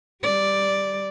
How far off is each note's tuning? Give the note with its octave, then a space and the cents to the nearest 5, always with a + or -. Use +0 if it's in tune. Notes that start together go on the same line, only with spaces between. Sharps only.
G3 +0 D5 +0